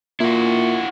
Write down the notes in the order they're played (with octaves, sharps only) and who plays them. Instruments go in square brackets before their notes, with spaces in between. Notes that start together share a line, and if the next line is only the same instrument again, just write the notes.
[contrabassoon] A#2 [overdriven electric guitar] E4 F#4